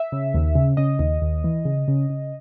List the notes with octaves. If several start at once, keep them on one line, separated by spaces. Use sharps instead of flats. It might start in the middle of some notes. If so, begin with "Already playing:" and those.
Already playing: E5
C#3
D#2
C#3
C#3 D#5
D#2
D#2
E3
C#3
C#3
C#3